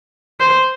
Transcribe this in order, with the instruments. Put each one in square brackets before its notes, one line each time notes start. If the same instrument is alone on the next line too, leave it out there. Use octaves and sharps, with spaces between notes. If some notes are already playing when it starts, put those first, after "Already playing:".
[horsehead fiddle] C5